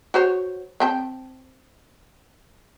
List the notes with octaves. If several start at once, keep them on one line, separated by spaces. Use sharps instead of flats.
F#4 C5 C#5
C4 G5 A5